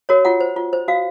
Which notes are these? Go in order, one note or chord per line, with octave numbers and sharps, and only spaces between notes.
F#4 A#4 C#5
F4 F#5
C5
F4
C5
F#4 F5